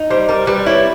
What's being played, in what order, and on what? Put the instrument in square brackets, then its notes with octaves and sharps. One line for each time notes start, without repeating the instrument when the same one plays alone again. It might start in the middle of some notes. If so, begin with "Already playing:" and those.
Already playing: [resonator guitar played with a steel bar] D#4
[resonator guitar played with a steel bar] G3 [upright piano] C5
[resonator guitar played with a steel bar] G3 [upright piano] A#4
[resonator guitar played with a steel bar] G3 [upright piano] B4
[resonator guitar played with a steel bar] E4 [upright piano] C#5